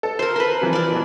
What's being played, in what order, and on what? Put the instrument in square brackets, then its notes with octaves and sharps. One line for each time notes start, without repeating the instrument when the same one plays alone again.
[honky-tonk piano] A4
[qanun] A#4 C5
A#4 B4
[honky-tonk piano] C3 E3 F3
[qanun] A#4 D5
[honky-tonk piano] B2 E3